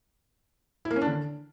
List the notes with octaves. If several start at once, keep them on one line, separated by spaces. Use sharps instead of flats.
E4
A#3
C#4
D4
D3